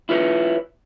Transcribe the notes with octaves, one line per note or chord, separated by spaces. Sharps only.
E4 F4 B4 C#5